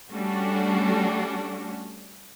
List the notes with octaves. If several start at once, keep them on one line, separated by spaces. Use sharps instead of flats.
G3 A3 C#4 D4 F#4